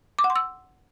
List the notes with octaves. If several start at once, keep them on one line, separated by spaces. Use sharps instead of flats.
D6
F#5
C6
E6